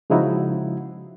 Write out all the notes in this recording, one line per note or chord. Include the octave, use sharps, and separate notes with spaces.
C#3 F3 G#3 D#4 E4 F#4